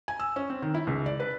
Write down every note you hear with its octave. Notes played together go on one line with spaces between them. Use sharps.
G#5
E6
C#4
C4
D#3
E4
C#2
D5
B4